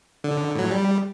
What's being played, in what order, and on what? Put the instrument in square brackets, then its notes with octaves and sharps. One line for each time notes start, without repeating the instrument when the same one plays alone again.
[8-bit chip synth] D3
A2 F#3
G3